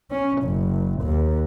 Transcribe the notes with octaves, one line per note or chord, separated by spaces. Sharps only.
C#4
F#1
D#2